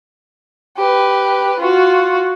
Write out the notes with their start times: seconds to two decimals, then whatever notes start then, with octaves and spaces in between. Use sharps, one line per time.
0.77 G4 B4
1.60 F4 F#4